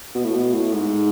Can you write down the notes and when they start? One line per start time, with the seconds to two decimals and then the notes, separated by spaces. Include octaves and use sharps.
0.15 B2
0.25 A2
0.35 B2
0.54 A2
0.74 G#2